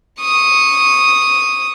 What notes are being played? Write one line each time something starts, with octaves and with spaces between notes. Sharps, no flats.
C#6 D#6